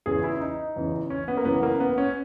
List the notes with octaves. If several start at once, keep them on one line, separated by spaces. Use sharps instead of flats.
E2 C#3 E3 G#4
E4
D#4
E2 C#3 E3
C#4
B3
A#3
F#2 C#3 E3 B3
A#3
B3
C#4